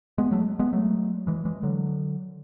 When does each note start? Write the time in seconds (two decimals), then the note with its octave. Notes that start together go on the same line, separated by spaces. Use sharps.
0.18 G#3 B3
0.31 F#3 A3
0.59 G#3 B3
0.73 F#3 A3
1.27 E3 G#3
1.45 E3 G#3
1.63 D3 F#3